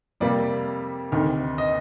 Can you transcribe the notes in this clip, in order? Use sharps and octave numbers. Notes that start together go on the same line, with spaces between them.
F2 C3 G3 A#3 D5
D2 C3 D#3
D#5